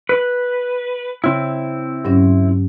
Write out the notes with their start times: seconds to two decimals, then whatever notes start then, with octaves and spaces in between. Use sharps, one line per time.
0.09 B4
1.24 C#3 C4 E4
2.05 G2 F#3 C#4